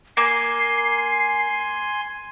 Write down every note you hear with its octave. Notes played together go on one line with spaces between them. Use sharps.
A#3 G#5 C6 C7